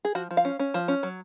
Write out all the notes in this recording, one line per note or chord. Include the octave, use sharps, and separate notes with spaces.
G#4
F3 F#4
F3
F5
C#4
C#4
F3
C#4
F#3